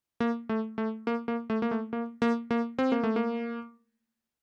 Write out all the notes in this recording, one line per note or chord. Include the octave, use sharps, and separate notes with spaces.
A#3
A3
A3
A#3
A#3
A3
A#3
A3
A#3
A#3
A#3
C4
A#3
A3
A#3